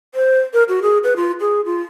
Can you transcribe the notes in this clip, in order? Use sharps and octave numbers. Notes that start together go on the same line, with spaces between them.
C5
A#4
F#4
G#4
B4
F4
G#4
F4